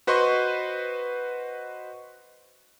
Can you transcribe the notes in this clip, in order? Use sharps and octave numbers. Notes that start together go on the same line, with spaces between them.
F#4 B4 C5 D#5 C6 C#6